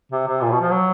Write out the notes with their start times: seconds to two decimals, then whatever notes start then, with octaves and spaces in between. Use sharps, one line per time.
0.12 C3
0.27 C3
0.42 A#2
0.51 B2
0.61 F3
0.71 F#3